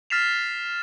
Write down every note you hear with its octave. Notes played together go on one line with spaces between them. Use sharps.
F6 A6 B6 C7 E7 F7